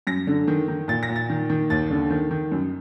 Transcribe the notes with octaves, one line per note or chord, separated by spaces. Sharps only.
F#2 A#6
D3
D#3
D#3
A#2 A6
A#6
A#2
A6
D#3
D#3
D#2 A6
D3
D#3
D#3
F#2